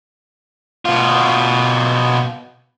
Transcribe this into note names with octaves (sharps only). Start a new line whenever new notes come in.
B2 F4